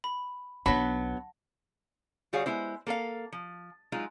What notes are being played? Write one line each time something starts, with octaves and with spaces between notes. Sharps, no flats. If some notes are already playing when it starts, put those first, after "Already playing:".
B5
B1 F#3 B3 D4 F#5 A5 B5 A#6
D3 G3 F#4 G#4 C#5 F5
G#3 B3 E4 C5
A#3 A4 A#4 F5
F3
F#3 G#3 D#4 F4